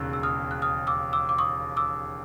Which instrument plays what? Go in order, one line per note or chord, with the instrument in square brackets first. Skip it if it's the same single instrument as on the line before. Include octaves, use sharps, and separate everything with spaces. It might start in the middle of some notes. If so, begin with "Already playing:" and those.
Already playing: [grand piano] E1 D#2 C#3 [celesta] E6 F#6
[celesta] E6
D#6 F6
F#6
D#6 F6
D6 E6
D6 E6
D6
C#6 D#6
D6 E6